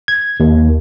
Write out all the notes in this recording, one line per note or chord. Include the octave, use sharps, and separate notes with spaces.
G#6
D#2